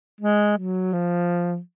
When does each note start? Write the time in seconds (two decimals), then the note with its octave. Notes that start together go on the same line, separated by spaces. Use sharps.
0.21 G#3
0.57 F#3
0.93 F3